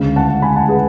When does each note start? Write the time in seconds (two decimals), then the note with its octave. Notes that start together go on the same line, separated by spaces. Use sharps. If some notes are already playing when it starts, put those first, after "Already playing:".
Already playing: D2 C#3 G#3
0.16 F#5 A5
0.42 G#5 B5
0.56 F#5 A5
0.69 G#4 B4